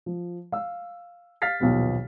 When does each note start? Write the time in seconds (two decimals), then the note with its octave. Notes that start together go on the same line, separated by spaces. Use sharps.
0.06 F3
0.52 F5 E6
1.42 F5 F6 A6 B6 C7
1.60 D#1 B1 F3 B3 G4